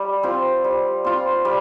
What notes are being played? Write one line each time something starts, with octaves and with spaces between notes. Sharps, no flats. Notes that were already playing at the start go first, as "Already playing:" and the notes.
Already playing: G3
C4 F4
G3
C4 F4
G3